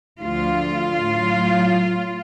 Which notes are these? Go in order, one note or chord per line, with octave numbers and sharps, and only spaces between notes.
D2 D3 F3 F4
A2 F#3